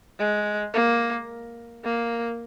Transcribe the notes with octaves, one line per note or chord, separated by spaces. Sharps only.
G#3
A#3
A#3